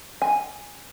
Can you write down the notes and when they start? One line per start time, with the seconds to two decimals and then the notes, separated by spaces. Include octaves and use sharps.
0.22 G#5